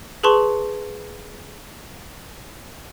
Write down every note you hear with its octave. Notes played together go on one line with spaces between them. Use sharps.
G#4 B4 A5 C6 C#6